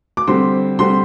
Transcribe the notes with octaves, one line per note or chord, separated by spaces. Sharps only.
D6
D3 G3 C4 C6
D3 G3 C4 C6